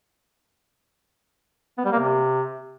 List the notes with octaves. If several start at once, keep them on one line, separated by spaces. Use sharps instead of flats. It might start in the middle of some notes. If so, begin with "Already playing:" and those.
B3
G3
A#3
C3